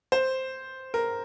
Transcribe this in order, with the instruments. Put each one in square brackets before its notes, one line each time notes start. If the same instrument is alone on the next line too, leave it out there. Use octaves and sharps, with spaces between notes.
[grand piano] C5
A#4